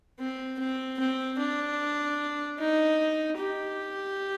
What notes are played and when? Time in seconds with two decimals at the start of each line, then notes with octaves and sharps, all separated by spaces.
0.19 C4
0.59 C4
0.99 C4
1.39 D4
2.59 D#4
3.38 G4